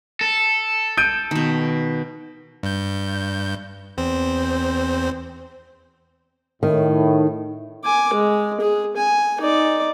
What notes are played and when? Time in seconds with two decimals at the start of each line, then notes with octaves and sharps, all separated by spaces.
0.21 A4
0.97 G6 D7 D#7
1.31 B2 D#3
2.63 G2 G6
3.97 E2 C4 C5
6.63 A2 D#3
7.84 G#5 D6
8.14 G#3
8.60 G#4
8.96 G#5
9.41 D#4 D5